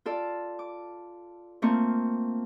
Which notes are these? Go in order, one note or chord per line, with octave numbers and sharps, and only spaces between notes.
F4 A4 D5
D6
A3 A#3 C4 F4 C#6